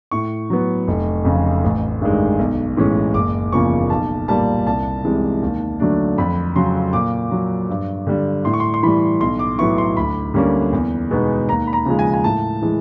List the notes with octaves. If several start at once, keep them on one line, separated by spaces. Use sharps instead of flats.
A2 C#6
F#3 B3
F1
F2 C#3
A1
G2 D#3 G#3
B1
A2 E3 G#3 C#4
F#1 D6
E2 C#3 F3 A#3 C#6
B1 A5
A#2 G3 A#3 A5
C2 A5
C3 E3 G#3
D#2
D3 F#3 A3 D4
F2 B5
C#3 F#3 C6
A#2 D6
F#3 A#3
G2
D3 G3
A2 C6
C#6
C6
C6
E3 G3 B5
B1 C6
D6
A2 F#3 B3 E4 C#6
C6
D2 B5
D3 G3 A#3 C#4
E2
B2 G#3 B3 D#4
D#2 A#5
B5
A#5
C#3 F3 G#3
G#5
G#5
A2 A5
E3 G#3